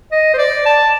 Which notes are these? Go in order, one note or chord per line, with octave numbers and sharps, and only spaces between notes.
D#5
C5
D5
A5